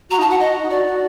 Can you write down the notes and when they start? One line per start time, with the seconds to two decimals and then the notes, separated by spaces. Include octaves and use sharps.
0.10 F#4 A#5
0.19 D#4 A5
0.25 F#4
0.30 F#5
0.40 D#5
0.62 D#4
0.70 F#4 D5
0.86 F#4